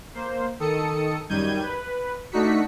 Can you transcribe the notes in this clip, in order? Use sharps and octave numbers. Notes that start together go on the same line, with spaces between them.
A#3 C5
D#3 A4 D#6 C#7
F#2 D#3 G3 G6 G#6 D#7
B4
A3 D4 D#4 F#4 B6 C#7